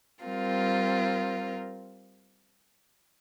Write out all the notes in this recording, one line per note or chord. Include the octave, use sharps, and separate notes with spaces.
G3 C4 F4 A#4